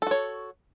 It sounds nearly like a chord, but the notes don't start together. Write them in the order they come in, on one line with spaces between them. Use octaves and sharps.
A4 F#4 C#5